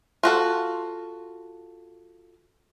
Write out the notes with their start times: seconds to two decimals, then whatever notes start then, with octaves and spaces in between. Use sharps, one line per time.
0.23 F4 F#4 A4